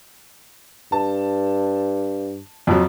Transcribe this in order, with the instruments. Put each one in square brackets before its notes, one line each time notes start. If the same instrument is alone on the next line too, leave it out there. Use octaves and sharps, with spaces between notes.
[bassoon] G2 [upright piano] A5
[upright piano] F2 F3 F#3